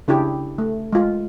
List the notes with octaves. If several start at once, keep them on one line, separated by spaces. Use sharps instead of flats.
C#3 D4 E4 G4 G#4
A3
G#3 F4